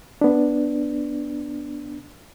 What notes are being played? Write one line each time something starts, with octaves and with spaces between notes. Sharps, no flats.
B3 D4